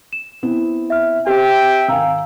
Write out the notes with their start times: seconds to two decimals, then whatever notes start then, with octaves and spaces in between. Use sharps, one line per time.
0.13 E7
0.43 B3 C4 E4
0.90 E5 F6
1.27 C4 G4 C5 E5 G5
1.88 G#1 F5 G#5 A#5 E6